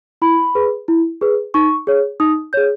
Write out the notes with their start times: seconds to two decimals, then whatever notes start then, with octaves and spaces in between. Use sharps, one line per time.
0.22 E4 B5
0.55 G#4 B4
0.88 E4
1.21 G#4 B4
1.54 D#4 C#6
1.87 G#4 C#5
2.20 D#4 D#6
2.53 G#4 C#5 G6